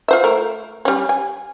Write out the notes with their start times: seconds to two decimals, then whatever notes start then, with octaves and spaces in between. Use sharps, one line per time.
0.08 F4 C5 E5
0.24 A3 A#4
0.85 G3 C#4
1.09 G#5